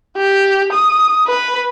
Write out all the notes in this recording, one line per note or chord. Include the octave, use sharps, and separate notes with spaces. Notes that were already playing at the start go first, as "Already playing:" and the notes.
G4
D#6
B4